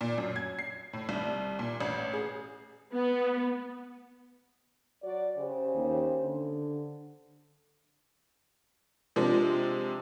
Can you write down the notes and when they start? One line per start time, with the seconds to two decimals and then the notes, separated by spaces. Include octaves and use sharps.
0.01 A#2
0.18 F#2
0.36 G#6
0.59 C7
0.93 A2
1.09 C2
1.59 A#2
1.80 A1
2.13 G#4
2.93 B3
5.03 F#3 F#4 D5
5.37 C#3 G4 C5
5.75 D#2
6.21 D3
9.16 C3 F3 G#3 D4